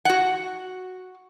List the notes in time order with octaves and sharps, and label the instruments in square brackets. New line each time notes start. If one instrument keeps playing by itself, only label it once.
[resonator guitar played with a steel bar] F#4 F#5